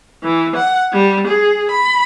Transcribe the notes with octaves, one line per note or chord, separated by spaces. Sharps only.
E3
F#5
G3
G#4
B5